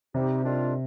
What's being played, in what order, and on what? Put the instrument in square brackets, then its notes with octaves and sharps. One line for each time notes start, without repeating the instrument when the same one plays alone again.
[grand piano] C3 [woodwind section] G3 C4 D#4 G4
[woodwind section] D#3 G3 D4 F4